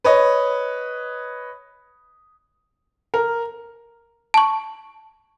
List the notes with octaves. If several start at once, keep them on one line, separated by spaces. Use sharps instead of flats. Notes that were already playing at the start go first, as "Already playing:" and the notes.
B4 C#5 D#5
A#4
A5 C#6